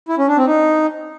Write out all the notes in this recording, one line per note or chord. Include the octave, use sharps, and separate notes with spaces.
E4
C#4
D4
C4
D#4